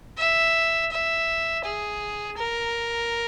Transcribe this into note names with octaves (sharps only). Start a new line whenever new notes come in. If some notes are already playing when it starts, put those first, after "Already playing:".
E5
E5
G#4
A#4